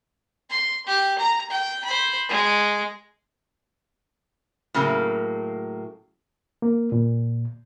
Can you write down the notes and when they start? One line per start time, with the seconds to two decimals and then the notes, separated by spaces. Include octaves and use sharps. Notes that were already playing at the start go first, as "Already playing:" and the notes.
0.50 C6
0.86 G4
1.19 A#5
1.50 G5
1.84 C5 B5
2.29 G#3
4.74 A2 C#3 F#3 A#3
6.62 A#3
6.92 A#2